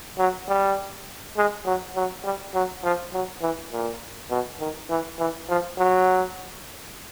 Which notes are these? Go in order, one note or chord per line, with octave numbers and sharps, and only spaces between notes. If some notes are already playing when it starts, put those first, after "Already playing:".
F#3
G3
G#3
F#3
F#3
G3
F#3
F3
F#3
E3
A#2
B2
D#3
E3
E3
F3
F#3